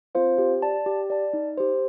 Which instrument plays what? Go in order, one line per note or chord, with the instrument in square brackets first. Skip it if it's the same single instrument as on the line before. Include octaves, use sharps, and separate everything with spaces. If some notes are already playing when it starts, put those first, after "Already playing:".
[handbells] C4 F4 C5 F5
G4
D5 A5
G4
D5 A5
D#4
G4 C5